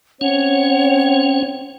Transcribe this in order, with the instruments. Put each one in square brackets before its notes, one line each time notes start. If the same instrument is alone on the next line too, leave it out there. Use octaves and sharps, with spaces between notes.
[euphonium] C4 [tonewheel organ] C#4 [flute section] C#5 F#5